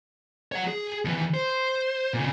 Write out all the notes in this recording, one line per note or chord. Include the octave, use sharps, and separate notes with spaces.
C#5 F#5
G#4
D#2 E3
C5
A#2 C#3